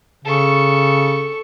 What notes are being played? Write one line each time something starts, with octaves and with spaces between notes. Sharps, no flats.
C#3 A4 C#6